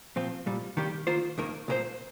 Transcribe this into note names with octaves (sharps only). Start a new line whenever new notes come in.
A#2 F3 C4 F4
C2 A#2 G3
D#3 G3 A#3 G4
D#3 A#3 F4 C5
D#2 D#3 A#3
C2 A#2 A#3 G4 C5